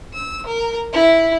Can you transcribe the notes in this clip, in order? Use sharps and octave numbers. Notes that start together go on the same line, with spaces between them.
E6
A#4
E4